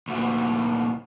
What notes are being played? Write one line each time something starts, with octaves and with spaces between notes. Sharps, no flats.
D2 A#2